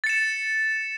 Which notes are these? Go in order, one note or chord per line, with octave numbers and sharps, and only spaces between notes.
A6 C#7 E7